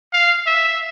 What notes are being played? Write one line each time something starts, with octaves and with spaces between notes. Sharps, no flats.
F5
E5